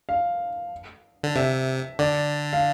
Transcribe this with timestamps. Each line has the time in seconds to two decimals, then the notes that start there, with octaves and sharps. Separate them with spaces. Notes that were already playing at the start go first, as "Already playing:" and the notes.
0.09 F5
1.23 D3
1.36 C3 E5
1.99 D3 D5
2.53 F5